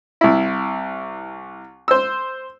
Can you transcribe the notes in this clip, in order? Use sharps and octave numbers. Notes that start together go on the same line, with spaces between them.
C2 E4
C5 E6